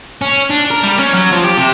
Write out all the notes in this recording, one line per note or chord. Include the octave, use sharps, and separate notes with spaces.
C#4
D4
A#4
G3
C#4
F#3
F3
G4
C3